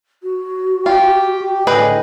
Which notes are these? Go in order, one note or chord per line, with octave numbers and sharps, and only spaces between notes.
F#4
F4 G4 G5
G4
A2 D3 G#4 B4 D#5 G5